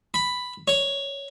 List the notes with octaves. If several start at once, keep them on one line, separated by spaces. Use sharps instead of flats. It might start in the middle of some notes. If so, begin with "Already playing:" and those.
B5
C#5